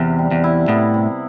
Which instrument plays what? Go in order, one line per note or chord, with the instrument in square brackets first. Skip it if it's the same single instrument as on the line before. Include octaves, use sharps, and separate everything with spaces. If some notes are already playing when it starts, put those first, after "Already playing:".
Already playing: [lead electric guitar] E2 [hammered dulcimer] C3
[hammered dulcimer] G3
[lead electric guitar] E2
[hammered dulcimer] E4
[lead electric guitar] A2 [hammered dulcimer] B3
[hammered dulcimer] C3